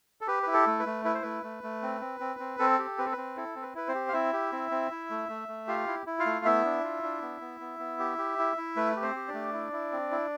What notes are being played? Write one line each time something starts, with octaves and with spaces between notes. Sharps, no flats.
A4
G4 B4
E4 B4
A4
A3
B4
A3
E4 B4
C5
A3 B4
A3
A3
C4
C4
C4
C4
C4 A4
G4
C4 B4
A4
B4
C4
E4 A4
C4
B4
E4 B4
C4 C5
G4
F5
C4 E4 E5
G4
C4
C4
E4
A3
A3
A3
F4 G4 F5
E4
E4
F4 F5
A3
B3 E4 E5
D4
F4
D4
B3
B3
B3
B3
G4
G4
E4
E4
A3 B4
G4
C4 C5
G4
D4 D5
A3
E4
E4
C4
E4